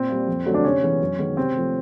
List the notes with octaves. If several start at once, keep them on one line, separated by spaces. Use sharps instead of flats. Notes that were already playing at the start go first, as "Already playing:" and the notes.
Already playing: A#2 C4
G3 A#3
F2
D3 F#3 A3
D4
C3 C#4
E3 G#3 B3
F#2
D#3 G#3 B3
C3 C4
F3 A3